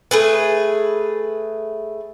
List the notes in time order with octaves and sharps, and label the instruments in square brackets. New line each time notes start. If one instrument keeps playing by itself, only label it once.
[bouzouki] A3 G#4 B4